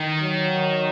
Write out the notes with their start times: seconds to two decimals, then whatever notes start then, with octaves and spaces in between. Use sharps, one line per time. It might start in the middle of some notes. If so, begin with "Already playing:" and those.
Already playing: D#3
0.21 F#3